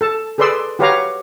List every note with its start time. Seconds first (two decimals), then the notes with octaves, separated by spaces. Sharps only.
0.01 A4 A5
0.38 G#4 A4 B4 D5 C6 E6
0.79 F#4 G4 B4 C#5 F5 A#5